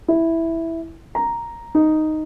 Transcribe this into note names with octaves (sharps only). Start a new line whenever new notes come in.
E4
A#5
D#4